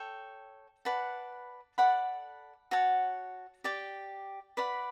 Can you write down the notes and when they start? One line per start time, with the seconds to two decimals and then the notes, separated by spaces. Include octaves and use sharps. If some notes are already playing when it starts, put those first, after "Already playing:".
Already playing: A4 C#5 G5
0.85 B4 D5 F#5 A5
1.78 A4 D5 F#5 B5
2.71 F#4 C#5 F#5 A5
3.64 G4 D5 G5 D6
4.57 B4 D5 F#5 B5